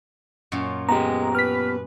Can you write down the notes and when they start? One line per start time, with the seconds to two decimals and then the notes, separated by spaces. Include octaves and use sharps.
0.52 F#2 A#2 F4
0.89 G#3 B3 G4 A#5
1.35 B4 F6 B6